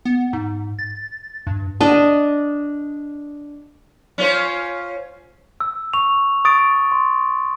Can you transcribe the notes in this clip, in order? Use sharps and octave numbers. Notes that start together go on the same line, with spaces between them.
B3
G#2
A6
G2
D4 D#5
C#4 F4 C5
E6
C#6 F7
C#6 D#6 A6 D7
D7
C6